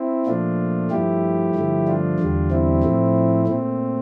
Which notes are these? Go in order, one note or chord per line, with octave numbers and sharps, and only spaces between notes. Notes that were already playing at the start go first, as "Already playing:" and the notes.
Already playing: C4 E4
A#2 F3 A3 D4 F4
G2 F3 A3 E4 G4
G2 D3 F3 A3
D4 F4
E2 D3 G3
C4 E4
A2 F3 A3
A#2 A3 C4